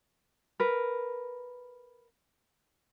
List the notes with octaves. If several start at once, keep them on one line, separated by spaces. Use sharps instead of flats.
A#4 B4